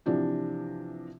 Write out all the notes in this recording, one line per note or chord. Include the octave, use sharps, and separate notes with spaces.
C3 E3 F3 D4 G4